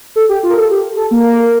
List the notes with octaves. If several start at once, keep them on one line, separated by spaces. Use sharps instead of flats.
A4
G4
F4
A#4
A4
G4
A4
A#3